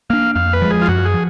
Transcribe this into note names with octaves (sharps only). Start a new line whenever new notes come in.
A#3 D4 F5
F2 F5
B4
F3 G#3
G#4
F4
F#2 F#4
G#4
F3